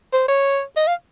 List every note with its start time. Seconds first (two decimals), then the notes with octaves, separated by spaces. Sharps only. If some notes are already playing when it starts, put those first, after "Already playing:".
0.13 C5
0.28 C#5
0.77 D#5
0.87 F5